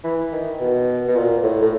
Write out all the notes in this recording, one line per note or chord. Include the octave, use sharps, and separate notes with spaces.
E3
D#3
B2
B2
A#2
A2
A2